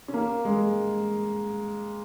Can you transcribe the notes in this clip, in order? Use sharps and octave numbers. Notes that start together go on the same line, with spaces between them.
C#4
A#3
G#3